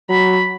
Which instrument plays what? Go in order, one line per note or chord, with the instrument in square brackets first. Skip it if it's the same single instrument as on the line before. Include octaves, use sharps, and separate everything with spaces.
[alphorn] F#3 [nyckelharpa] B5